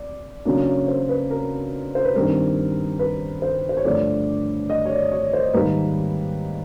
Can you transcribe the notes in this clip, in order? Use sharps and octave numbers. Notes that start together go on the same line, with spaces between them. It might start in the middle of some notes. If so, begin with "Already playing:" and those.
Already playing: D5
C#3 F#3 A#3 D4 C#5
C#5
C5
B4
A#4
C5
B4
G2 D#3 G3 C4 A#4
B4
C5
C5
C#5
G2 D3 F3 A3 D5
D#5
C#5
D5
C#5
C5
G#2 D#3 G3 A#3 B4